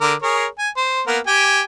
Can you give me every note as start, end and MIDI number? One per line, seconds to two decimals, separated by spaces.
0.01 0.14 50
0.01 0.14 70
0.01 0.14 86
0.22 0.46 68
0.22 0.46 70
0.22 0.46 73
0.59 0.70 80
0.77 1.02 72
1.07 1.19 58
1.07 1.19 59
1.07 1.19 70
1.27 1.62 67
1.27 1.62 79
1.27 1.62 80